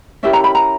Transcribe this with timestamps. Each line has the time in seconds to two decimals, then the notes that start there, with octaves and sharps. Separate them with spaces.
0.23 C#4 E4 G4 A#4 E5
0.33 A#5
0.44 B5
0.55 A#5